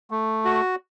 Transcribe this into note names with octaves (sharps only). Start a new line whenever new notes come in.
A3
F#4